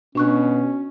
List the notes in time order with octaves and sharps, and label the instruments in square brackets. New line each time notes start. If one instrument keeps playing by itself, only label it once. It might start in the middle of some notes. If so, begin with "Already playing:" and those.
[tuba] B2 [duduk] C#4 [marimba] D4 C#6 F#6